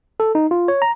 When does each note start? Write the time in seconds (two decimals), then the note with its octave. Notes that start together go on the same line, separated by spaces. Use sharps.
0.20 A4
0.35 D#4
0.51 F4
0.68 C#5
0.82 A#5